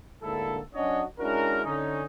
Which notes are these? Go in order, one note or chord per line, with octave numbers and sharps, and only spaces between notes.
D2 G#2 D3 A#3 E4 A4
F#3 C#4 D4 F#4 C#5 D#5
G#3 C#4 D4 E4 F#4 A#4
D3 C#4 D#4